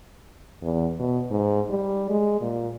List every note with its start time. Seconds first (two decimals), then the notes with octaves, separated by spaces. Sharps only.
0.62 E2
0.99 B2
1.31 G#2
1.70 G3
2.10 G#3
2.41 A#2